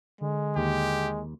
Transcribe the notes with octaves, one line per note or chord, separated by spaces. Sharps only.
D3 G#3
D#2 G4